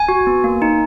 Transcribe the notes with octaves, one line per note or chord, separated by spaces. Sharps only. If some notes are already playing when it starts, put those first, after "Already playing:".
Already playing: G#5
F#4
B3
A#3
D#4